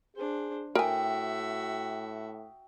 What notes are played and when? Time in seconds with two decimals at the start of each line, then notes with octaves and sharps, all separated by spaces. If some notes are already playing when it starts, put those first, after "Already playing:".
0.16 D4 G#4 C5
0.75 A2 F#4 A#4 E5 G5 G#5 D#6